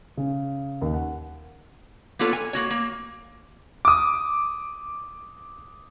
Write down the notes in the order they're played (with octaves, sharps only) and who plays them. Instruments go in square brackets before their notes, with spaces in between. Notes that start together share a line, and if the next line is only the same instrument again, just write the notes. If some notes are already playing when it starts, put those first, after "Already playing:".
[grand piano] C#3
D#2
F#5
[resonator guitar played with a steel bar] A#3 B3 F4 A4 C#5
G#5
A#3 F#4 C#5
A#3
[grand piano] D6 D#6